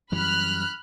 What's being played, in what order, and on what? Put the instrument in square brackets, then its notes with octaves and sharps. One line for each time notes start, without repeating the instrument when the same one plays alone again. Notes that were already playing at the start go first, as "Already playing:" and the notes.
[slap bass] F#2 E3 G3 [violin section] B5 F6 F#6